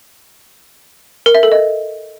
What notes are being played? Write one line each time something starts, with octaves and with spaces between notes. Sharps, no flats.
A#4
E5
A4
D#5